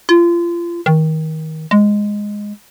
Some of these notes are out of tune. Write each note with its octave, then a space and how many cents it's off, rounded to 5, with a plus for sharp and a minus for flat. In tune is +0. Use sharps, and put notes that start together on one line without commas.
F4 -30
D#3 +25
G#3 -5